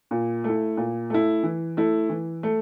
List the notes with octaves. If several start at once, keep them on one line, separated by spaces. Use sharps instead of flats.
A#2
A3 E4
A#2
A3 E4
E3
A3 E4
E3
A3